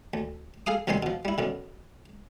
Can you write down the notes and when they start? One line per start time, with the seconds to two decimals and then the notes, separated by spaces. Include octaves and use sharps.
0.14 D2
0.67 G#4 A4 F5 D#6
0.87 D2 C3 D#3 G3 G#5 C6
1.03 B2 F3
1.25 G3 E4
1.38 F#2 B2 D3